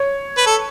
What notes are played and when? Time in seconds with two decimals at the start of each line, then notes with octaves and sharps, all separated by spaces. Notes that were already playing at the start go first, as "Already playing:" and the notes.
Already playing: C#5
0.37 B4
0.46 A4